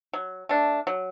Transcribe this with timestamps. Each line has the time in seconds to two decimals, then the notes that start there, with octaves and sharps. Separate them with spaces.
0.13 F#3
0.49 A3 D4
0.87 F#3